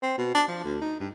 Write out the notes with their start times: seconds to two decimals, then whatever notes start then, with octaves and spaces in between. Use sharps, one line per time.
0.03 C4
0.18 B2
0.34 D4
0.48 F3
0.64 D2
0.81 D#4
1.00 G2